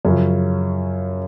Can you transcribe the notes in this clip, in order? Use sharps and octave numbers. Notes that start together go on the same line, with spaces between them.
F#2 C#3 F3 C#4